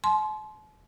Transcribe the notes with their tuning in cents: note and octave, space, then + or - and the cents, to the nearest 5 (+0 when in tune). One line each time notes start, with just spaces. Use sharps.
A5 -45 C6 +0